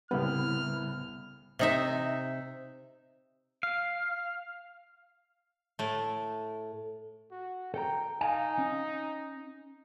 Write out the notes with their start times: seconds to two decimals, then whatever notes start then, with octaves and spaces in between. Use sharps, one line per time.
0.11 C2 A2 C#3 G3 B3 B4 F6
1.59 C3 D#4 E5
3.63 F5
5.79 A2 A3
7.31 F#4
7.74 A4 G5 A#5
8.21 D#4 F5 G#5
8.58 C#4